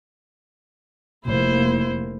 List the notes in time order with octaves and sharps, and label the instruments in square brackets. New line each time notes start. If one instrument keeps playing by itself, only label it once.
[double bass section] F1 A#3 [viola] E4 C5